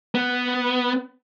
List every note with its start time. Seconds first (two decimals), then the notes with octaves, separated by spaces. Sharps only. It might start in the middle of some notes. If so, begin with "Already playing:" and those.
0.15 B3